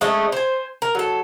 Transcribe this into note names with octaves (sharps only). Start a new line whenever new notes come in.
G#3 A3 C#4 D#5
C5 G#5
A#4
F#3 A4